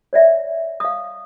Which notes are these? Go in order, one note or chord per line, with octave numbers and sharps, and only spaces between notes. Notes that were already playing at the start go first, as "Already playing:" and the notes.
C#5 D5 E5
F5 D#6